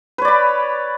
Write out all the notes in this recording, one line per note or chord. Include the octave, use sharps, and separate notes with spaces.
B4 C#5 D5 B5